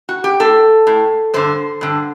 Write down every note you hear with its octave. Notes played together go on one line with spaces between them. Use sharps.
F#4
G4
A2 A4
A2
G2 D3 C5
G2 D3